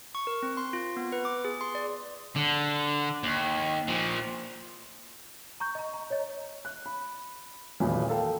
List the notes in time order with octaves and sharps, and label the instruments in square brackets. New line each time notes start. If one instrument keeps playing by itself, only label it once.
[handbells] C#6
A#4
C4
C6
F4
B3
B4
D6
G#4
C6
D5
[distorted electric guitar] D3
D#2
A#2 F3
[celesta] A#5 C#6 G6
D#5 A#5
A#5
C#5 D#5
[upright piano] F#6
B5
D#1 B1 E2 A#2 F#3 B4
A4 A#4 F5 G5 A5